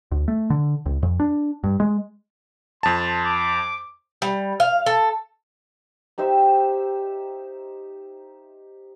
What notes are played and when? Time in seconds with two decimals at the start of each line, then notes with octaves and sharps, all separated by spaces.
0.11 D2
0.28 A3
0.50 D3
0.86 C#2
1.03 F2
1.20 D4
1.64 G2
1.80 G#3
2.83 F2 A5 C6
3.25 D6
4.22 G3
4.60 F5
4.86 A4
6.18 D#4 G4 C5 E5